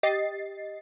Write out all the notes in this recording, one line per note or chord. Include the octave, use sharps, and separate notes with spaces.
G4 D#5 A6 C7